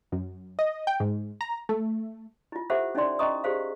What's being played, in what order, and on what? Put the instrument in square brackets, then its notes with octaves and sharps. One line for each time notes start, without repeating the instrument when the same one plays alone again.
[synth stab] F#2
D#5
G5
G#2
A#5
A3
[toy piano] E4 F4
G4 A4 C5 E5 F#5 D6
C#4 D#4 E4 D5 C6
C#4 D#5 A#5 C#6 D#6
G4 G#4 C5 F5